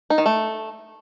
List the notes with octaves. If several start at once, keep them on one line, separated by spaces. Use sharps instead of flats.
D#4
D#3
A3